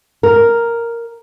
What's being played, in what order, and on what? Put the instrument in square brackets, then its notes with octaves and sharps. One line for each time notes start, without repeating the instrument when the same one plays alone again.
[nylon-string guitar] A#4